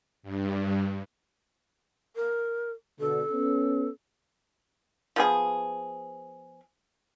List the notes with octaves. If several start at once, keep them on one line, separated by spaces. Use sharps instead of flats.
G2
A#4
B2 D3 A4
B3 C#4
F3 B3 G#4